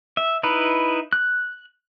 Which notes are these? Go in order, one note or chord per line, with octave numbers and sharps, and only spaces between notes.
E5
D#4 E4 B4
F#6